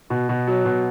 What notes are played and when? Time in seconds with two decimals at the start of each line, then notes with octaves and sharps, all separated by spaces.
0.10 B2
0.29 B2
0.47 F#3
0.65 B2